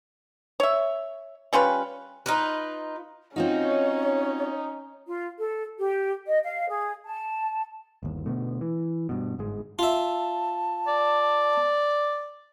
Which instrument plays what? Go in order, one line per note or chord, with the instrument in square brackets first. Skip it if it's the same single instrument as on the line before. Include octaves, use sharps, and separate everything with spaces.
[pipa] C#5 E5
G3 C#4 F4 B4
[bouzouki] D#4 F4 B4
[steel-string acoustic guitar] C4 F4 F#4 [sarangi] C#4 [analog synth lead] D#4 [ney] C#5
[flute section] F4
A4
G4
D#5
F5
G#4
A5
[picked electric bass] G1 D#2
B2 D3 A3
E3
G2 B2
G1 G#2 G#3
[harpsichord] F4 E5 [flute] A5
[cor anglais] D5